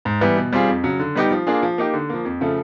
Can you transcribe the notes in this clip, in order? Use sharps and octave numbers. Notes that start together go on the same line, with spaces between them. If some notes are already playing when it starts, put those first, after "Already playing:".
G#2
E3 G3 B3
B2
G3 C4 F4 G#4
F2
C#3 F#3
D3
G3 B3 D#4 G4
F3
A#3 D4 F4 G#4
F3
A#3 D#4 G4
D3
F3 A#3
F2
C#3 F3 A3